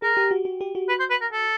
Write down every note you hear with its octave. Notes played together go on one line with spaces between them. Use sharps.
G#4 A#4
G4
F#4
F#4
G4
F#4
B4
C5
B4
A#4
A4